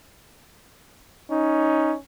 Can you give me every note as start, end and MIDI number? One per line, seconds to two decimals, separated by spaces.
1.31 1.99 61
1.31 1.94 63